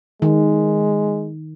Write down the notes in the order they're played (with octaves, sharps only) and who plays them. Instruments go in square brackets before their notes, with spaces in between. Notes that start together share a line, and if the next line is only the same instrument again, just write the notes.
[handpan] D#3 [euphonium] G#3